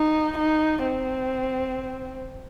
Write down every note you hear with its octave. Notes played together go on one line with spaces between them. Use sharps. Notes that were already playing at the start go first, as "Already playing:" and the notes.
Already playing: D#4
D#4
C4